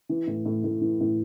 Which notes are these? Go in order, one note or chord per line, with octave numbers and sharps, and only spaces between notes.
E3
A2
A2
A2
E3
A2